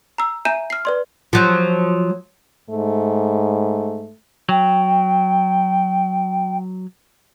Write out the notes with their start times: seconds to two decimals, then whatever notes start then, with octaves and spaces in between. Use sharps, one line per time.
0.18 A#5 E6
0.45 E5 G#5 A#5 G6 D#7 E7
0.70 F6 C7
0.85 B4 D5 C6
1.33 F3 F#3
2.70 G#2 A3
4.49 F#3 G5